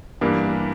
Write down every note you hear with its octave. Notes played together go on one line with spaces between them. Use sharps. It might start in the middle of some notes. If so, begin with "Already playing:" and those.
G2 E3 G3 A#3 D4